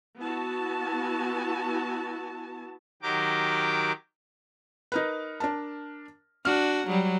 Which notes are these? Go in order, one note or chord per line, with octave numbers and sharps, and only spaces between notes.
B3 E4 F#4 A5
D#3 F#3 G4 A#4 G5 D6
D#4 A#4 B4
D4 A#4 A5
D4 F#4 F6
F#3 G3